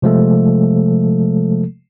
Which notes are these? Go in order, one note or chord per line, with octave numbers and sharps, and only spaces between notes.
C3 F3 G#3 A3 A4